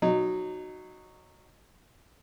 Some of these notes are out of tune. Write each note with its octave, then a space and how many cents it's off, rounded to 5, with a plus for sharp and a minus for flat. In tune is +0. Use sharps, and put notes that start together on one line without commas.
F#3 +0 D#4 -15